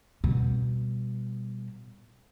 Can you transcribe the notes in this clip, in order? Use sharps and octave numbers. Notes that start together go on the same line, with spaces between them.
B2 G3